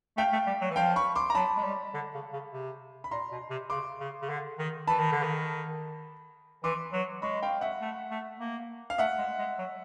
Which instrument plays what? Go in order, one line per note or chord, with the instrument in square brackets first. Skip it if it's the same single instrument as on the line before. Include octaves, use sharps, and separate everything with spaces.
[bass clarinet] A3 [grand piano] F5 G5
[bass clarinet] A3
G3
F#3
E3
[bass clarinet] F3 [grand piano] F5 G5
[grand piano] B5 C#6
C6 D6
A#5
[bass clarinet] F#3 [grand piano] A5 B5
[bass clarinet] G#3
G3
D3
C#3
C#3
C3
[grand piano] B5
[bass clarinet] A#2 [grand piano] A#5 C6
[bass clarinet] B2
C3
[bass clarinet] C#3 [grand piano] C6 D6
[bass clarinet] C#3
C#3
D3
D#3
[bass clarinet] E3 [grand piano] A5 B5
[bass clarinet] D#3
D3
D#3
[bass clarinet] E3 [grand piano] C6 D6
[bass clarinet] F#3
[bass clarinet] G#3 [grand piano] B5 C#6
[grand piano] F5 G5
E5 F#5
[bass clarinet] A3
A3
A#3
[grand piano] F5
[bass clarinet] A3 [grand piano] E5 F#5
[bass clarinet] G#3
G#3
F#3